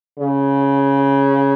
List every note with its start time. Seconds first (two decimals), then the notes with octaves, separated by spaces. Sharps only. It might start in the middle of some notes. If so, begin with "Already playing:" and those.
0.19 C#3